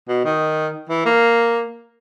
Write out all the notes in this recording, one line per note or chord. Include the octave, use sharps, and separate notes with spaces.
B2
D#3
E3
A#3